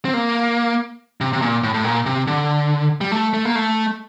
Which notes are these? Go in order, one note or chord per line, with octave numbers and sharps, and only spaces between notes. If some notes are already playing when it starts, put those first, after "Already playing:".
C4
A#3
C3
C3
A#2
A2
A2
A#2
C3
D3
G3
A3
A3
A#3
A3